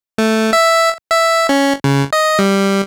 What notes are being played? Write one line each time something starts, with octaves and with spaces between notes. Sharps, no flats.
A3
E5
E5
C#4
C#3
D#5
G3